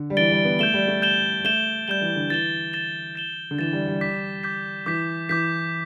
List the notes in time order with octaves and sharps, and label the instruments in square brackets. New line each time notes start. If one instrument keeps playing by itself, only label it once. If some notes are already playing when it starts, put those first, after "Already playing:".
Already playing: [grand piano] D3
G3
[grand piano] E3 [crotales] A6 D7 G7
[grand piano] G3
B3
[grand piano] A3 [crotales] G6 E7 G7
[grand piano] G3
A3
[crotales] G6 E7 G7
[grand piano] A3 [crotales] G6 E7 G7
[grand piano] G3 [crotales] G6 E7 G7
[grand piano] E3
D3
[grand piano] E3 [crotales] A6 E7 G7
[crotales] A6 E7 G7
A6 E7 G7
[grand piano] D3
[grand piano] E3 [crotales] A6 E7 G7
[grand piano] G3
G3
[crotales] D6 G6 B6
D6 G6 B6
[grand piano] E3 [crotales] D6 G6 B6
[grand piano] E3 [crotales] D6 G6 B6